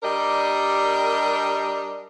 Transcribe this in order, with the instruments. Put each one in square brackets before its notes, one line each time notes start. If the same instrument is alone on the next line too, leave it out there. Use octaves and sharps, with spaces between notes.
[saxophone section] G3 D4 G4 A#4 D#5